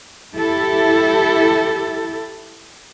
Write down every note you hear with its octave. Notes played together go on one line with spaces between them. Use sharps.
E4 G4 A4